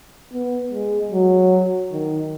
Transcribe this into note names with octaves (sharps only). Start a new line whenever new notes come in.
B3
G#3
F#3
D#3